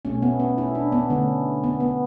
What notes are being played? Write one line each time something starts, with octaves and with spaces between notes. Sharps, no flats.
B2 A3 C#4
B3
C#4
E4
D4
B3
D3 A3 C#4
B3
B3